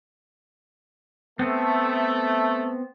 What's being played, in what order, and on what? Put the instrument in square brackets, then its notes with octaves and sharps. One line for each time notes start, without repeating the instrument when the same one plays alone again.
[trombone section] A3 [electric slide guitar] B3 C4